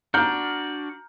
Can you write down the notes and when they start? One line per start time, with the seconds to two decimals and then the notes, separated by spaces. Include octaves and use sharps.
0.14 D4 F#4 D5 A#5 F6 G6